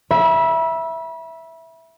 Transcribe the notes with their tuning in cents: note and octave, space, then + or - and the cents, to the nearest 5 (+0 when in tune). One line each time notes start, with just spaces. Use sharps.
E5 +0 B5 -35